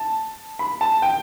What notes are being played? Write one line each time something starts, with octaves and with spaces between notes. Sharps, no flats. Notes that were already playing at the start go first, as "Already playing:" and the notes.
Already playing: A5
B5
A5
G5